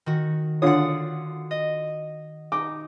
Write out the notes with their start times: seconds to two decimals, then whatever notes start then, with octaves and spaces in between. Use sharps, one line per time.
0.06 D#3 F#4
0.62 D3 F4 C#5 F#5 D#6
1.51 D#5
2.52 D#4 D6